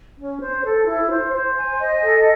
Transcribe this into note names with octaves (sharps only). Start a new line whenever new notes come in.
C#4
C5
A4
E4
C5
C5
G#5
D#5
A4